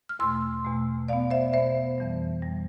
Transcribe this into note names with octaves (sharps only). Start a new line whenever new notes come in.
F6
E2 B2 A3 C6 E6
E2 B2 A3
B2 B3 D5 F5
C5 E5
B2 B3 C5 E5
F2 E3 G3
F2 E3 G3